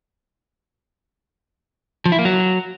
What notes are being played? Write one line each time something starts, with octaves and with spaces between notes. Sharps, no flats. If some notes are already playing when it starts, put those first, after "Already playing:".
F3
E4
A#3
F#3